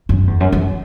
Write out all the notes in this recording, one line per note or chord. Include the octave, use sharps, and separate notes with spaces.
F#2
E2
F#2
F#2